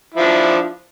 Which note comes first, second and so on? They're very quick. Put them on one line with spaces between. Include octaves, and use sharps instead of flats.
E4 F3 D4